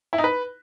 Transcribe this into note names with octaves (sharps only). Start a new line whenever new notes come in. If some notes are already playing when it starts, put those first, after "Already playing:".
E4
D#4
B4